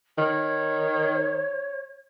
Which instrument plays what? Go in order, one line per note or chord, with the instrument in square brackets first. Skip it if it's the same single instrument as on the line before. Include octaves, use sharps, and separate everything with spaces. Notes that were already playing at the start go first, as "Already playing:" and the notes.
[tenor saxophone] D#3 [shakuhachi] C#5